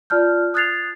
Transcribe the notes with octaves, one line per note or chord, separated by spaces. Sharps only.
F4 D5 A5 F6 G6
D#6 F#6 G#6 A6 C7 F7